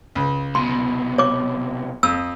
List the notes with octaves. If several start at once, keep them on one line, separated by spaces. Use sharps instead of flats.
C#2
C2 B2 C6
C#5 D6
F2 D#6 E6